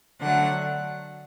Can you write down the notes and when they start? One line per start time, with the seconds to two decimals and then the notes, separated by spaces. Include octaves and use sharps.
0.20 D3 F#3 A3 F#5